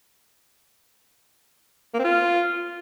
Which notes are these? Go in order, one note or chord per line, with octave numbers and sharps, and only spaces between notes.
A#3
C4
F4